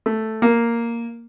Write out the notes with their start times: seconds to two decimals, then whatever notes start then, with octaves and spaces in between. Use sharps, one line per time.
0.06 A3
0.42 A#3